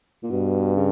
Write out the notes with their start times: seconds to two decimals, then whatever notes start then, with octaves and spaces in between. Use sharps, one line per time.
0.23 A#2
0.31 G2 B2
0.76 C#3